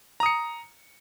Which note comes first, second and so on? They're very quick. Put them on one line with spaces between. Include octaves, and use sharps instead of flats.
A#5 D#6 C#7